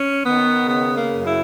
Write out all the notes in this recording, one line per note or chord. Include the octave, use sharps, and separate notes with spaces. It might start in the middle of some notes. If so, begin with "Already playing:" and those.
Already playing: C#4
D#3 B3
C#3 B3
A#3
F#2
E4